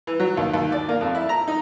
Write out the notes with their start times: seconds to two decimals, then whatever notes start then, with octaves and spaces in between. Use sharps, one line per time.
0.07 E3
0.20 F#3
0.37 D#2
0.54 D#2
0.72 D5
0.89 A#3
1.01 F2
1.15 E4
1.29 A#5
1.48 D#4